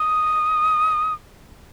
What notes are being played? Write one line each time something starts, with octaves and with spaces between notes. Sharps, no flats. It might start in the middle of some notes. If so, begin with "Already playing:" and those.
Already playing: D#6